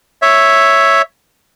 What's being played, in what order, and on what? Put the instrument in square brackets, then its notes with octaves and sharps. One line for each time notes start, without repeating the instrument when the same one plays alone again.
[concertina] C#5 E5